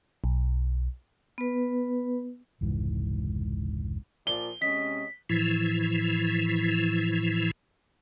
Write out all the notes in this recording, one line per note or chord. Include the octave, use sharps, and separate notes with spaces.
B1
B3 B4
F1 C#2 G#2 E3
A#2 F3 D5 G7
C3 G#3 C#4 D#5 B6
A2 E3 F3 E4